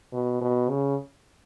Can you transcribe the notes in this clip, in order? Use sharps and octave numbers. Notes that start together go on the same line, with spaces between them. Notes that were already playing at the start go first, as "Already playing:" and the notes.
B2
B2
C#3